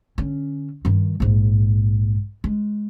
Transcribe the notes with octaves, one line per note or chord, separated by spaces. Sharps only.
D3 C#4
G2 D#3
A#1 G#2
G#3